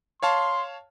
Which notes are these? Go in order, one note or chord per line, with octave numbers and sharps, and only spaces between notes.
C#5 F5 A5 C6